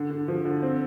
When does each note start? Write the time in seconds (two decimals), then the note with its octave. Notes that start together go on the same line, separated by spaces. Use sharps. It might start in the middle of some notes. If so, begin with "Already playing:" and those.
Already playing: D3
0.10 D3
0.28 F3
0.45 D3
0.62 C4